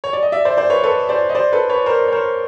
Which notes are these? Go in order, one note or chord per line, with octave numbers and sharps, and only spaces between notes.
C#5
D5
D#5
D5 E5
C5 D5
C5 D5
B4 C#5
A4 B4
C5 D5
D#5
C5 D5
A4 B4
B4 C#5
A#4 C5
C#5
A#4 C5